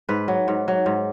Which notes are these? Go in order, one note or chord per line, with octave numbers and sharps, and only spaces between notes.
G#2 B4
F#3
G#2
F#3
G#2